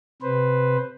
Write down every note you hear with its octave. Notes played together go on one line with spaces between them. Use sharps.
C3 B4 C5